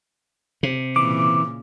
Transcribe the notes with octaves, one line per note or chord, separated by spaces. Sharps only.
C3
A#2 C#3 E3 D6